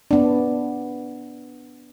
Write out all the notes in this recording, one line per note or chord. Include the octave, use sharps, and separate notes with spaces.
B3 D4